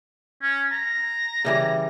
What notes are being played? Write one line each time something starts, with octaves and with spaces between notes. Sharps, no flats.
C#4
A#5
C#3 E3 G3